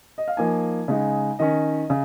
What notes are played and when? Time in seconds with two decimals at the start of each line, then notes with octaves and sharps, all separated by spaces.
0.18 D#5
0.28 F5
0.37 F3 A#3 D#4 G#5
0.88 C#3 G#3 D#4
1.39 D#3 C#4 D#5
1.90 C#3